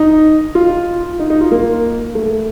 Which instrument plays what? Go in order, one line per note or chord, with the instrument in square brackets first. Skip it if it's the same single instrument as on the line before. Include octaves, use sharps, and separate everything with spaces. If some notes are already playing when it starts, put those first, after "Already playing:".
Already playing: [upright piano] D#4
F4
D#4
D#4
F4
A#3
A3